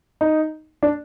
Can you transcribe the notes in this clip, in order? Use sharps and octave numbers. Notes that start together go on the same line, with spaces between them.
D#4
D4